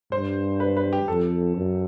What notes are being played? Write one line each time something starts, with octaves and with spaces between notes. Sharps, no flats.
G2 C5
B4
B4
G4
F2 A4
F#2